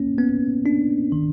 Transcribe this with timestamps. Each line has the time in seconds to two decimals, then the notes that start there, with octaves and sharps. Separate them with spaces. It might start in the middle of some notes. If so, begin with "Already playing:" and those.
Already playing: A#3 C#4
0.18 B3
0.66 D4
1.12 D#3